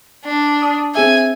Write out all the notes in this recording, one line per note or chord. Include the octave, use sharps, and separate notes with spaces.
D4
D#6
C4 G#4 E5 G#5